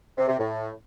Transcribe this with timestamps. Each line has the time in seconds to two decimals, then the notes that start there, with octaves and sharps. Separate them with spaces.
0.18 C3
0.28 C3
0.38 A2